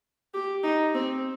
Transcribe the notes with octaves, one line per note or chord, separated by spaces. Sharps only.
G4
D#4
C4